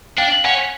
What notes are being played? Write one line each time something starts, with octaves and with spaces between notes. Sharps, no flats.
D4 F5 G5
C#4 F#5 G#5